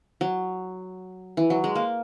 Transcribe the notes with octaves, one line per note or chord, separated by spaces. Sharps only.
F#3
E3
F#3
G#3
A#3